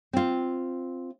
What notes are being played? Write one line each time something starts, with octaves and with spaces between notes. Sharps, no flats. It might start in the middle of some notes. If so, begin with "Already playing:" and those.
C4 F4